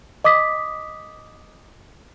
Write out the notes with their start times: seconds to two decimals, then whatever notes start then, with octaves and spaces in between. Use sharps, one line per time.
0.24 D#5 D6 D#6 B6